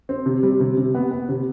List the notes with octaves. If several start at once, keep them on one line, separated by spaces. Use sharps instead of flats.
C4
C3
G3
C3
C3
B3
B3
C3